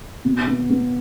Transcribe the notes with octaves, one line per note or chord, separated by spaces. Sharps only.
B2
B3
B3